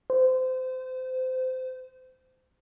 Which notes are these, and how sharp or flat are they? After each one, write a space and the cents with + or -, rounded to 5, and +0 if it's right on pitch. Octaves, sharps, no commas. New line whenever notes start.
C5 -25